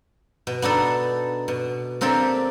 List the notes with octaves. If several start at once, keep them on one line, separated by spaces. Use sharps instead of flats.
B2
B3 D4 D#4 A4
B2
A#3 C4 D4 G4 A4